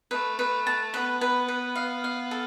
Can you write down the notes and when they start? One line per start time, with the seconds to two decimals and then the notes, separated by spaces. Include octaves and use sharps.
0.11 A3 B4
0.39 B4
0.67 A5
0.93 B3 B4
1.21 B4
1.48 B4
1.76 F5
2.04 F5
2.31 A4